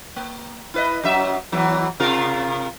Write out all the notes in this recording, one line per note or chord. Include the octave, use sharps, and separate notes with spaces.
A#3
E4 B4 D#5
F#2 F#3 E5
E2 E3 F#3
C3 F4 A#4